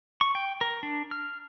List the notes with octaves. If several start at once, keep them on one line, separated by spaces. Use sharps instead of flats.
C#6
G5
A#4
D4
F6